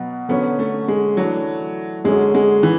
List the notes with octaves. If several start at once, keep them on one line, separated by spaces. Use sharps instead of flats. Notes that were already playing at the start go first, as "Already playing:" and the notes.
Already playing: B2 F#3 B3
D3 F#3 B3 C#4
A3
G#3
E3 F#3 A3 D4 F#4
F#2 D3 F#3 G#3 C#4
G#3
E3